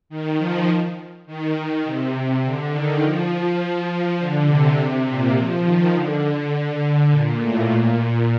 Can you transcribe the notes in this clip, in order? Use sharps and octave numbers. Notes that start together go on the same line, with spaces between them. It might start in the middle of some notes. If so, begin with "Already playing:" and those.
D#3
F3
D#3
D#3
C3
D3
D#3
F3
F3
D3
C3
A#2
F3
D#3
D3
D3
A#2
A2
A#2